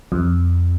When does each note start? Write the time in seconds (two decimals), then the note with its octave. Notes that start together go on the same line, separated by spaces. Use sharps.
0.12 F2